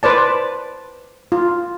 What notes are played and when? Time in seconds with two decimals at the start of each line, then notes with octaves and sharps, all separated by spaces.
0.03 B4 C5 D5 A5
1.32 F4